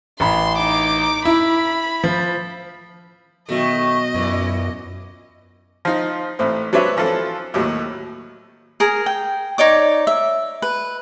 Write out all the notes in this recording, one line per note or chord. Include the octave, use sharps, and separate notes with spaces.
A1 B5 C6
D#4 D6
E4 B5
F3
B2 D#3 F#3 A3 D#5
F#2 A#2 E3
F3 D#4
A1 A2 C4
F#3 C4 D4 B4 C#5 E5
E3 F3 C4 A4
D#2 A2 F#3
G#4 A#4
G5
D#4 C#5 D5 D6
E5
B4